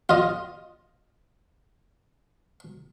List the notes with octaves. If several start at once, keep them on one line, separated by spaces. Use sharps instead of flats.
F4 D#5